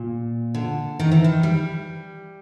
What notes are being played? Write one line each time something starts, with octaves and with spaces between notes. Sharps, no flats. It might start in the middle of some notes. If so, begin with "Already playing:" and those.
Already playing: A#2
D3
D#3
E3
D#3
G3